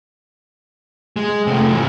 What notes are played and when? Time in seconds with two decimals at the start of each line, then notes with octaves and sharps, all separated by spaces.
1.16 G#3
1.47 C3 A3
1.71 G#2 E3